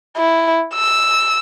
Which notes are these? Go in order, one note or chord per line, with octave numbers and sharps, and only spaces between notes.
E4
E6